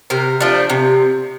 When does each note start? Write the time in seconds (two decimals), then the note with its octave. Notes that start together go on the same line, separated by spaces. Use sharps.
0.10 C3 A#4
0.40 F3 A3 D4
0.70 C3